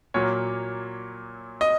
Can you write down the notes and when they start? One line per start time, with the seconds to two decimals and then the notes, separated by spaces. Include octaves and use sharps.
0.14 A#2 F#3 A#3 C#5
1.61 D#5